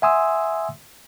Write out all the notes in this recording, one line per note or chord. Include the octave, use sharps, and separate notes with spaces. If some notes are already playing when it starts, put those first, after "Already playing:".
E5 F#5 G#5 C6 D#6 E6